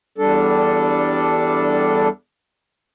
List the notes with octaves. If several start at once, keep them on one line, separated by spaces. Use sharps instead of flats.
E2 G3 D4 A4